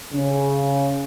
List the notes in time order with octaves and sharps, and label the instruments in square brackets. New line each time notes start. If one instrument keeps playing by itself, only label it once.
[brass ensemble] C#3